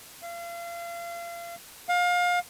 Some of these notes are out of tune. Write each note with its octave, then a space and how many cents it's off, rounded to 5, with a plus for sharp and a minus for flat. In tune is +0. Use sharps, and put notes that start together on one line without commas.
F5 -35
F5 +30